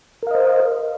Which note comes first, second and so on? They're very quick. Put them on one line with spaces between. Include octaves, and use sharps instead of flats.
A#4 F5 D#5 C5